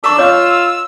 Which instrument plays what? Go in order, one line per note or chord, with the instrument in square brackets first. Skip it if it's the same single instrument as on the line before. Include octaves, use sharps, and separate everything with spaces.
[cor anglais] D4 [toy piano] A4 A#5 C#6 [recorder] E6
[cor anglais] F4 [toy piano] C#5 D#5 F5